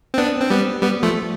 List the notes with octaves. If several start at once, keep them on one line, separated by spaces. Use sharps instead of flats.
C4
B3 D4
C4
G3 B3
G3 B3
F3 A3